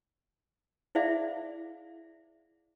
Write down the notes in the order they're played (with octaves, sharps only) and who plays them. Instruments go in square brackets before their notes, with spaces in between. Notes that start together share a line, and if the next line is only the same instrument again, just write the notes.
[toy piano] E4 G#4 C5 D5 E5 F5